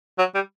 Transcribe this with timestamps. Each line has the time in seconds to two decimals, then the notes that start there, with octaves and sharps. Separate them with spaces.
0.19 F#3
0.34 G3